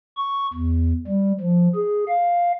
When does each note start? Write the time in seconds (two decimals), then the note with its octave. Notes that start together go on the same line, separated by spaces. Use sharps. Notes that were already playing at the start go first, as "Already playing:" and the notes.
0.17 C#6
0.53 E2
1.08 G3
1.41 F3
1.75 G#4
2.08 F5